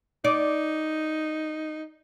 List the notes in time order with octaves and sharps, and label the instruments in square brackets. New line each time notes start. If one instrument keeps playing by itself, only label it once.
[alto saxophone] D#4 [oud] D5